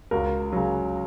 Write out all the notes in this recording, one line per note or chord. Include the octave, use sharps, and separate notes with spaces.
C#2 F#4 A#4
C#3 F#3